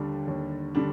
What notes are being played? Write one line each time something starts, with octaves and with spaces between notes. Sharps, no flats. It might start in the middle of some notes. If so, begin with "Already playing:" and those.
Already playing: D#2 D3 G3 D4
D#2
D3 G3 D4